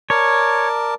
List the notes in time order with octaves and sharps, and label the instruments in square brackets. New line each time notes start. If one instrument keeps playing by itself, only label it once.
[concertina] A#4 D5 A5 [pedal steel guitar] C#5